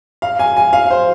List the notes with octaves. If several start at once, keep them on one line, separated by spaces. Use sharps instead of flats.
F5
G#5
G#5
F5
C5